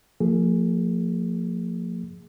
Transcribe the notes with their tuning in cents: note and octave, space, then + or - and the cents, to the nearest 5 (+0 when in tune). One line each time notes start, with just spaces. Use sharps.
F3 +15 A#3 -40 G#4 +0